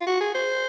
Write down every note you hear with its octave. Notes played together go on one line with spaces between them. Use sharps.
F4
F#4
G#4
C5